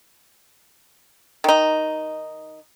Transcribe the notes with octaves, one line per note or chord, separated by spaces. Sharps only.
D#3 D#4